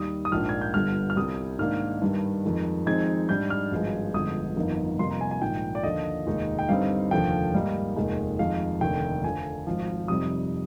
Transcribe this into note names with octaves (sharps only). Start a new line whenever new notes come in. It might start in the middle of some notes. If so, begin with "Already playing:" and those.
Already playing: D#2 D#3 G3 D#6
D#6
A#1 G#2 F3 A#3 D4 F6
G#6
G6
G1 G2 D3 G3 F6
F6
C2 C3 G3 D#6
G#2 D#3 A#3 D4 F6
G2 D#3 G3
F2 D#3 G#3
F2 D#3 G#3 C4 D#4 G#6
G#2 G3 D4 G6
F6
G#1 G2 F3 G#3
G1 F2 D3 G#3 D#6
G1 F2 D#3 A#3 D#4
F2 C3 G3 A#3 D#4 C6
A#5
G#5
G#5
A#1 G#2 D#3 G5
D5
D#2 D3 F3 D#5
F1 D#2 D#3 G#3 D#4
G5
G2 D3 G3 C4 D#4 F5
F1 D#2 D3 F3 G5
G#2 G3 A#3 D#4
F1 D#2 D#3 G#3
F2 D#3 G#3 F5
F1 D#2 D3 G5
F2 D3 F3 G#5
G#1 G#2 F3
F2 C3 G3 C4 D#4 D#6